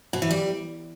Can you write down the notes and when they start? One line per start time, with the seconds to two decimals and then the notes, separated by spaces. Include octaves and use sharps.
0.13 B2
0.22 E3
0.31 G3